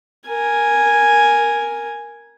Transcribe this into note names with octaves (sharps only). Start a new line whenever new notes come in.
A#4 G#5